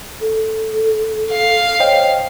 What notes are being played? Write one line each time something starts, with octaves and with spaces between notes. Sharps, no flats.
A4
F5
C5 C#5 D#5 G5